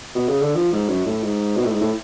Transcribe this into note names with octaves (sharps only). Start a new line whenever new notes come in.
B2
C#3
D3
F3
G#2
F#2
A2
G#2
B2
A2
G#2
A2